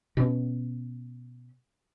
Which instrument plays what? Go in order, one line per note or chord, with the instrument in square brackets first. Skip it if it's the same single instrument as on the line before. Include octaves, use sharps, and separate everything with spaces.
[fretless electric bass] B2 C#4